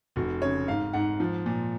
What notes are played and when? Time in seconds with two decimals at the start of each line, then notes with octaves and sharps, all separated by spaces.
0.16 F1 F#4
0.42 C#3 C#5
0.68 G#2 F5
0.93 G#2 F#5
1.20 F3
1.46 A#2